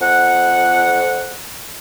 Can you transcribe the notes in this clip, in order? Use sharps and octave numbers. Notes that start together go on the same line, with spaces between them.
F2 F#5